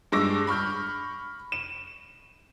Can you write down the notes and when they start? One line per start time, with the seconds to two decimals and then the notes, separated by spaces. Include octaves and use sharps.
0.12 G2 G#3 C#6 D6 E6 A#6
0.47 B5 C#6 F6 G6
1.52 E7